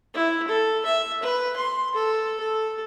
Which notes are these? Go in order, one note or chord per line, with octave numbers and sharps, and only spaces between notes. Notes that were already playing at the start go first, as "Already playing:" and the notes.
E4
A4
E5
B4
C6
A4
A4